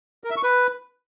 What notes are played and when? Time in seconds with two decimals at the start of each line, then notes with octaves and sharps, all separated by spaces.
0.24 A#4
0.30 E5
0.37 C#6
0.43 B4